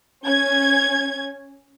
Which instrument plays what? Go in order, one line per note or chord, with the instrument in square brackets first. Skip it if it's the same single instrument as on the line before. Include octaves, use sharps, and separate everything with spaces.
[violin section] C#4 G#6